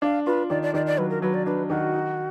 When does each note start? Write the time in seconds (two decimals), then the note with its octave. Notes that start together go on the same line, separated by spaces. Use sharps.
0.02 D4 F5
0.26 F4 B4
0.50 D#3 D5
0.62 D5
0.74 D#3 D5
0.86 D5
0.98 F#3 B4
1.10 A#4
1.22 F#3 B4
1.34 D5
1.46 D4 B4
1.69 D#3 F#4
1.93 D#4